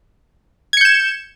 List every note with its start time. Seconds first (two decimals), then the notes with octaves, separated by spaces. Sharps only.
0.73 G#6
0.77 C#7
0.81 G6
0.85 E7